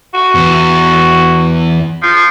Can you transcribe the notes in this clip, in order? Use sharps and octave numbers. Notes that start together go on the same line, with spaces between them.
F#4
E2
F3